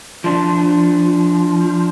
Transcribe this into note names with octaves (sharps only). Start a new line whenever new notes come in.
F3 D4